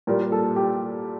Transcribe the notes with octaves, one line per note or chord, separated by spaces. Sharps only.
A#2 G3 A#4
A4
G4